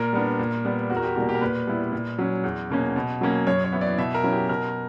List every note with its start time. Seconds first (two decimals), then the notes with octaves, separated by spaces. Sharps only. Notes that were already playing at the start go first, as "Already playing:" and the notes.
Already playing: A#2 A#4
0.13 G3 B3 D4
0.39 A#2
0.65 G3 B3
0.90 E2 F#4
0.97 A#4
1.03 G4
1.16 B2 G3 A#3 F#4
1.29 G4
1.35 A#4
1.41 A#2 B4
1.67 G3 B3 E4
1.93 A#2
2.18 F#3 C#4
2.44 E2
2.70 B2 A#3 C#4
2.96 B2
3.21 F#3 A#3 C#4
3.47 F#2 C#5
3.64 C#5
3.72 E3 B3 E4
3.81 D5
3.98 B2 E5
4.14 A#4
4.24 F#3 C#4 E4
4.32 G4
4.49 B2 A#4